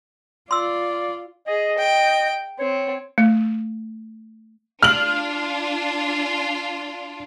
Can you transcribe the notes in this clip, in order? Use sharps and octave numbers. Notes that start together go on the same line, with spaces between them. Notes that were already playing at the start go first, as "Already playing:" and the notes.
F4 D5 C6 E6
G#4 D#5
G5
C4 C#5
A3
D4 F4 F6 F#7